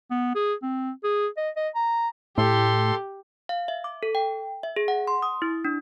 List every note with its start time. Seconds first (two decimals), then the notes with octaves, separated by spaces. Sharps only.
0.11 B3
0.35 G#4
0.62 C4
1.04 G#4
1.37 D#5
1.56 D#5
1.75 A#5
2.38 A2 G4 A4 C6
3.49 F5
3.68 E5
3.84 D6
4.03 A4
4.15 G5
4.63 E5
4.76 G#4
4.88 F#5
5.07 C6
5.22 D#6
5.42 E4
5.65 D4